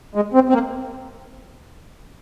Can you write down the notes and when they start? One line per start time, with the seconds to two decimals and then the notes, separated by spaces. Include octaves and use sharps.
0.15 G#3
0.34 C4
0.49 C4
0.53 A#3